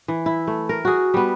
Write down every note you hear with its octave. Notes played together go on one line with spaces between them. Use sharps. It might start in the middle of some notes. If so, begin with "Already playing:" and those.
E3
E4
A3
A#4
F#4 G#4
G3 B3